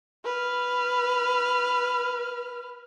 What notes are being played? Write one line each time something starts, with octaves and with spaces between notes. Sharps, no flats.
B4 F6